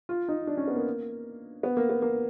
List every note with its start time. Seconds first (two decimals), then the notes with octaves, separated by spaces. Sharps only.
0.09 F4
0.29 D#4
0.47 D4
0.57 C#4
0.68 B3
0.76 A#3
1.63 B3
1.77 A#3
1.89 B3
2.02 A#3